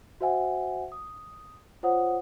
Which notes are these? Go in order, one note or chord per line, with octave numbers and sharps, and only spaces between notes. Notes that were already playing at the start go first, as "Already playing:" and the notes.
F#4 C5 E5 F#5 G#5
D#6
F4 C5 C#5 F#5 D#6